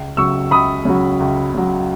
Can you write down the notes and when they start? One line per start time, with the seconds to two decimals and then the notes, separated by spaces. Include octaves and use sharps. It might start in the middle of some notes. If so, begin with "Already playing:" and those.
Already playing: C#2
0.17 C#3 F#3 C#6 E6
0.51 C#2 B5 D#6
0.85 C#3 F#3
1.20 C#2
1.54 C#3 F#3